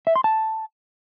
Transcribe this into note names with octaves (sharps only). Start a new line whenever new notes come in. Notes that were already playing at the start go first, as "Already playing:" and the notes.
E5
C6
A5